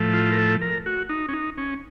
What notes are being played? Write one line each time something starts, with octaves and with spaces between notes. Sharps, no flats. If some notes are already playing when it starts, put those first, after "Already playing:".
Already playing: A2 F3 A3
F4
A#4
A4
A#4
F#4
D#4
C#4
D#4
C#4